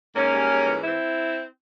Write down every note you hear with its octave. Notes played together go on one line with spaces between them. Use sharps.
G#2 A#3 C#4
G3
G#2
E3
C4 E4